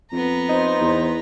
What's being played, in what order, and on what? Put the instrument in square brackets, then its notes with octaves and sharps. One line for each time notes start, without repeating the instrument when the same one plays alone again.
[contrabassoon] F2 [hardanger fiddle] B3 A#5
[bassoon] D#4 [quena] C5
[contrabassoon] E2